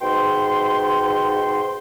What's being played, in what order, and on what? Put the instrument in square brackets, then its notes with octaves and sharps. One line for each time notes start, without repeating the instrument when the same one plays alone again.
[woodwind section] G#2 B2 G5 C6